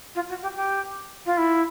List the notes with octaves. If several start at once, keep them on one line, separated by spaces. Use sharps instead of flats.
F4
F#4
G4
G4
F4
E4